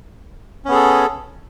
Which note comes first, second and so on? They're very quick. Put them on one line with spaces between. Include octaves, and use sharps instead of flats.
C#4 B3 G#4 A4